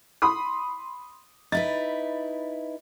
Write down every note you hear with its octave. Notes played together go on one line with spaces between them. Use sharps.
B5 C6 D#6
D#4 E4 B4 A6